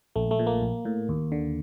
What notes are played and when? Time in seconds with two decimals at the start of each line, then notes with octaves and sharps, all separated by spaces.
0.16 A#1 A3
0.31 A3
0.39 A#2
0.47 A#3
0.62 A#1
0.85 A2
1.09 D#2
1.32 D3